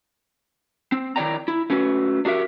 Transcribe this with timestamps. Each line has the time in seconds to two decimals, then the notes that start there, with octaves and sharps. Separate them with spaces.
0.92 C4
1.16 D#3 E4 C#5 D5 G5 A#5
1.48 E4
1.70 A3 C#4 F#4 B4
2.25 D4 F#4 G4 A#4 E5